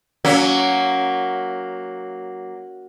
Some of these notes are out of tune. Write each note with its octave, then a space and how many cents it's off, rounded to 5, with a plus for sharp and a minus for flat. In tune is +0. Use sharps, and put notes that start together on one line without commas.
F#3 +0 A#3 +0 C#4 +20